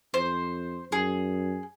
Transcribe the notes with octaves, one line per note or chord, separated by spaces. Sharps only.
F2 C5
F#2 G#4